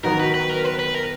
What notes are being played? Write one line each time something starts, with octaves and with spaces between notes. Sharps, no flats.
D#3 F#3 B3 A#4
B4
B4
A#4
B4
B4
A#4